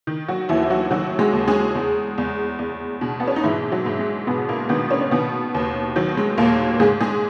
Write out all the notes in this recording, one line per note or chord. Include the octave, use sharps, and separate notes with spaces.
D#3
F#3 F#4
D#2 E3 E4
E4
F#3 F#4
D#3 F#3 F#4
G#3 G#4
D#2
G#3 G#4
E2
E2
E2
B2
B3
C#4
D#4
G#2 E3 E4
F#3
G#2
G#3
G#2 B2 B3
A#2 A#3
B2 D#3 B3
C#3 C#4
C#4
B2 D#3 B3
D#2
D#3 F#3
G#3
D#2 A#2 A#3
G#2 G#3 G#4
G#3 G#4